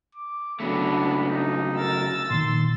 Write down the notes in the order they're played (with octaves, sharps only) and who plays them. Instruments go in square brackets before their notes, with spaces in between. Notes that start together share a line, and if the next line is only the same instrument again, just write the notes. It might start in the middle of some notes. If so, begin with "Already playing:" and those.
[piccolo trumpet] D6
[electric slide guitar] C#3 F#3 A3 [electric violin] B3 D4 [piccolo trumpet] B5
[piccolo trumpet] D#4
[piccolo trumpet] A#4 [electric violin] E6 A6
[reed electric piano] A#2 D#3 [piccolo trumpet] C6